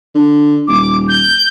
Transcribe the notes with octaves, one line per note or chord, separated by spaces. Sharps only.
D3
D#1 D6
G6